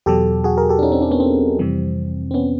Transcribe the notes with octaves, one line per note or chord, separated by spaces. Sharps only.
E2 B2 F#3 G4 A4
F#4 G#4
G#4 A#4
G4 A4
D4
C#4 D#4
C4 D4
C4 D4
B3 C#4
C4
F2 C3 E3 G3
C4
B3 C#4